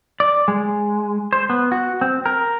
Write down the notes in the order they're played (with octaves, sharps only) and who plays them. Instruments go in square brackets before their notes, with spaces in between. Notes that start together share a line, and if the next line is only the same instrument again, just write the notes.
[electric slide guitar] D5
G#3
C5
B3
F#4
C4
A#4